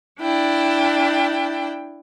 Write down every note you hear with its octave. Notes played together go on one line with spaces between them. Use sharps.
D4 E4 G5